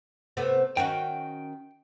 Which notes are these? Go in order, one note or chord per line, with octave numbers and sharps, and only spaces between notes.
C3 A3 B3
D#3 C#4 F#4 G5